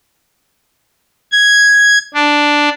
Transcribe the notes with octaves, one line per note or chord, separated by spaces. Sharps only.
G#6
D4